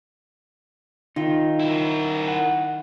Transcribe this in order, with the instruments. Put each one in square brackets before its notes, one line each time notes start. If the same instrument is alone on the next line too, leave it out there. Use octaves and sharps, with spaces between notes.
[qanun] D#3 [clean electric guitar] D#4 F4
[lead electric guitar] E4 A#4
[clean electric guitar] F#5